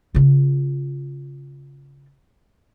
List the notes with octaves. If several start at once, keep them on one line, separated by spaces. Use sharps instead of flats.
C#3 F4